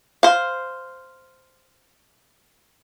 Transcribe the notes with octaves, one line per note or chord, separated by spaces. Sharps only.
C5 F5